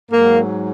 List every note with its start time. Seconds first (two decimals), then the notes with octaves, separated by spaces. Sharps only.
0.10 G#2 F#3 A#3